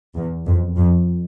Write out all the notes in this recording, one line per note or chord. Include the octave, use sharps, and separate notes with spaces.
E2
F2
F2